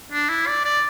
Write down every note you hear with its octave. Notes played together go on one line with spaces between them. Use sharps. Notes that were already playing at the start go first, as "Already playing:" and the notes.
D4
E4
D5
D5